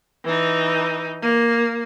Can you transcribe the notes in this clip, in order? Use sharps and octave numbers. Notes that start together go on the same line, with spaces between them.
E3 D#4
A#3